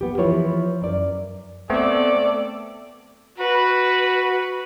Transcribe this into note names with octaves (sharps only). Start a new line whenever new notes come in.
B3 G4
E3 F3 E4 B4 C#5
F#2 D5
A3 B3 C4 A4 D5
F#4 B4